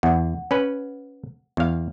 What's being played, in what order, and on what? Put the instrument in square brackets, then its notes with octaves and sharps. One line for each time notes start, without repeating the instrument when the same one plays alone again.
[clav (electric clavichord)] E2 [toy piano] F#5
[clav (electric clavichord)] C#4 B4
E2 F5